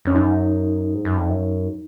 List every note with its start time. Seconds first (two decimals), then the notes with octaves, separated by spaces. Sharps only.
0.05 F2 C#4
0.15 F#2 D#4
0.94 G#2
1.05 F#2
1.17 F2
1.29 F#2